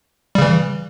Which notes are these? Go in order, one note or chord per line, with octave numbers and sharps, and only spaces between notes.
C#3 E3 G3